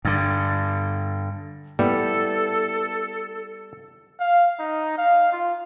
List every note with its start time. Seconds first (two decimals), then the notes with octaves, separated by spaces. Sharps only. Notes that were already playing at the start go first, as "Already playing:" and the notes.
0.05 G2 D3
1.79 G3 B3 E4 A4
4.19 F5
4.59 D#4
4.98 F5
5.32 F4